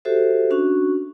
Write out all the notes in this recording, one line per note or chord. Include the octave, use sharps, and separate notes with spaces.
F#4 G4 A4 C5 E5
C#4 D4 F#4 C#6